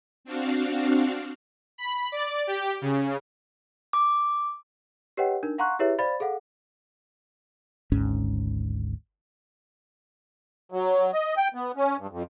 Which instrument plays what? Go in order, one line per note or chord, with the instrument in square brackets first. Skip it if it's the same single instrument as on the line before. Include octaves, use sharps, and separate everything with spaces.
[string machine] C4 D4 F#4 F5
[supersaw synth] B5
D5
G4
C#3
[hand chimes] D6
[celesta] G4 B4 C#5 D#5 F#5 G5
D4 D#4 A#4
F5 F#5 A#5 C6 C#6 F#6
E4 G4 G#4 B4 C#5 E5
C5 D5 F5 B5 A6
G#4 A4 F5 F#5
[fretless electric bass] G#1 D2 G#2 C#4
[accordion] F#3
D#5
G5
B3
C#4
G2
F2